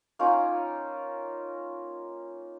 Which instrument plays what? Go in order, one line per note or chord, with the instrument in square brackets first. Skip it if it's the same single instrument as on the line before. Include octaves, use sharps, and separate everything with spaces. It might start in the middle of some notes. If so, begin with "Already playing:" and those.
[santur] A#3 C#4 D#4 F4